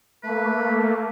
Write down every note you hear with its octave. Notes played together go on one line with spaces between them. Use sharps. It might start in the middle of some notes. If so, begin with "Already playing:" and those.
A3 A#3 B4